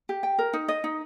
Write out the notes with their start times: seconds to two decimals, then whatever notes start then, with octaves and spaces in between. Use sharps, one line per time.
0.09 G4
0.23 G5
0.39 A#4
0.53 D#4
0.68 D#5
0.84 D#4